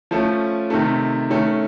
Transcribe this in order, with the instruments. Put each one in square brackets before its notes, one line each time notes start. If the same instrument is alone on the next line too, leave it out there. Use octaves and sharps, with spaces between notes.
[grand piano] F3 A3 C#4
C3 D#3 A3
D#3 A3 C#4